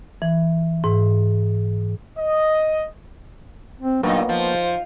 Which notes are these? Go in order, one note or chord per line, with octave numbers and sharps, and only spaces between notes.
E3
G#2
D#5
C4
G2 A#2 F#3 A#3 B3 D#4 C#5
F3 C5